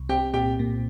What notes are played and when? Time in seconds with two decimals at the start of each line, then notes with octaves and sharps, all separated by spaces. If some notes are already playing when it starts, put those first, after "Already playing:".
Already playing: C2
0.09 C4 G4 G5
0.34 A#2 G4 G5
0.59 A#2